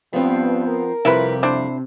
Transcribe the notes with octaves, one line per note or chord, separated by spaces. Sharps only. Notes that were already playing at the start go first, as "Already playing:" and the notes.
G2 F3 B3 C4
A#4
F2 C3 G3 E4 F4 B4
D4 E4 C5